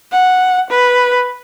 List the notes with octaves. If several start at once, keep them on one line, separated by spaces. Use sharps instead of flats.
F#5
B4